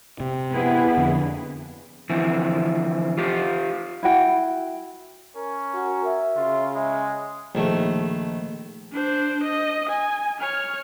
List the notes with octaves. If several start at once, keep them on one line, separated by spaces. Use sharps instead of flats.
C3
B3 E4 G#4 B4
F2 D3
D3 E3 F3 C4 E4
F4 G4 C5 F5
E4 F#4 G5
C#4 A#4
F#4
E5
C#3 F4
G#3 E5
A#1 D#3 A3
D4 C5
D#5
G#5
C#5 F6